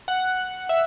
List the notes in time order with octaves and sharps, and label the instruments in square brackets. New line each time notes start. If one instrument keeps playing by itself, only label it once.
[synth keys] F#5
E5